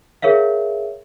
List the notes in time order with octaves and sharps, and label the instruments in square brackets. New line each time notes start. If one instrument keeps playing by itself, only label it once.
[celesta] G#4 A#4 C#5 E5 F5